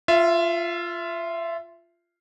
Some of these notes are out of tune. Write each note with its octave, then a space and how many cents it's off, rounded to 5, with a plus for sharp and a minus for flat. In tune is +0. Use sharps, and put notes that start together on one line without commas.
F4 -10 E5 +20